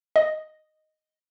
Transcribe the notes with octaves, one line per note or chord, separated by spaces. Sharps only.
D#5